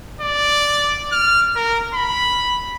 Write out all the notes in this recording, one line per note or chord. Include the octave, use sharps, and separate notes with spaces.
D5
F6
A#4
B5